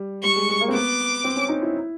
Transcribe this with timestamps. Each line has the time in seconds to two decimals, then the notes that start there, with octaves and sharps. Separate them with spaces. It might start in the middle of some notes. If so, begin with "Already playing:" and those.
Already playing: G3
0.23 G3 C#6
0.36 G#3
0.49 G#3
0.61 A#3
0.68 C4
0.73 B3 D6
1.24 C4
1.36 C#4
1.49 D#4
1.62 E4